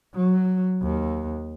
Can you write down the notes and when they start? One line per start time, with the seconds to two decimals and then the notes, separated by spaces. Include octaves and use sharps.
0.14 F#3
0.82 D#2